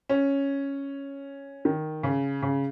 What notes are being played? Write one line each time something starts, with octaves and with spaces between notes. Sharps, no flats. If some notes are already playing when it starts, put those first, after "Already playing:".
C#4
D#3
C#3
C#3